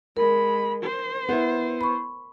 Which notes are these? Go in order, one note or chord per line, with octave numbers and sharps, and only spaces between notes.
G#3 A#4 B5
C5
B3 E4
B5 C#6